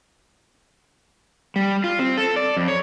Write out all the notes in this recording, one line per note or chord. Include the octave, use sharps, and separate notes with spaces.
G3
F4
C4
A4
D5
F2
C#5